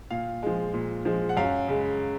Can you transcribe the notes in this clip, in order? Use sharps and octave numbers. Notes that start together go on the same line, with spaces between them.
A#2 F5
F3 G#3
A#2
F3 G#3
F#5
F#2 F5
C#3 G#3